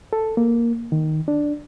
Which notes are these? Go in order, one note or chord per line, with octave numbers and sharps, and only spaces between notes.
A4
A#3
D#3
D4